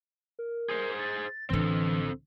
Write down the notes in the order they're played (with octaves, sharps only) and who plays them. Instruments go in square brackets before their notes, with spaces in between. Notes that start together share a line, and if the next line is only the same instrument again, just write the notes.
[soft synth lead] A#4
[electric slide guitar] G#4 C5
[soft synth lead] A6
[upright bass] A1 D3 [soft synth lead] E3 [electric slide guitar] C4 A4